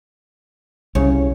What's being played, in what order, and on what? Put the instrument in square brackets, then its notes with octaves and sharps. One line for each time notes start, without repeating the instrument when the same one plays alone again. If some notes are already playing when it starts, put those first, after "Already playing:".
[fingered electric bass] C2 [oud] C#3 C#5